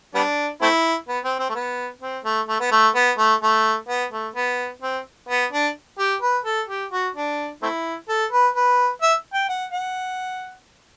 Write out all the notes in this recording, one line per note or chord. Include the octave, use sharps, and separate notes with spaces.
G3 B3 D4
A3 C4 E4
B3
C4
C4
A3
B3
C4
A3
A3
B3
A3
B3
A3
A3
B3
A3
B3
C4
B3
D4
G4
B4
A4
G4
F#4
D4
A3 C4 E4
A4
B4
B4
E5
G5
F#5
F#5